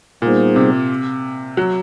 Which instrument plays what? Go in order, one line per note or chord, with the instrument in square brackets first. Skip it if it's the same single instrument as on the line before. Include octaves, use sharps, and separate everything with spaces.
[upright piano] A#2 [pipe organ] G3 B3 D#4 G#4 C5
[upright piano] C3
F#3